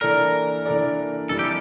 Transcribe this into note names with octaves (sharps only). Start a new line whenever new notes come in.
E3 A#3 D4 A4 A#4 D5
E3 A#3 D4 A4 D5
F2 E3 G3 A#3 A4
G4